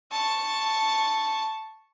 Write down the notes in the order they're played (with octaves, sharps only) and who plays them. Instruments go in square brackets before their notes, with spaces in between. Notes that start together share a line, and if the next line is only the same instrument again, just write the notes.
[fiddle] A5 C#6